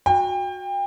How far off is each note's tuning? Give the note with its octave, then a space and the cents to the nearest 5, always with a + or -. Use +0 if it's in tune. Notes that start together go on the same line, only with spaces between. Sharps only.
F#4 -15 G5 +30